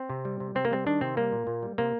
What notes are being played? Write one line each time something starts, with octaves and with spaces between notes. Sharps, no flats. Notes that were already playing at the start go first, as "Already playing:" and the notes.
Already playing: C4
C3
G3
C3
C3 C4
A#3
G3 C4
D#3 D4
C3 C4
G3 A#3
A#2
A#2
G3
C3 A#3